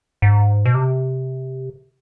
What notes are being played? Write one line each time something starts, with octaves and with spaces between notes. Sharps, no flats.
G#2
B2
C3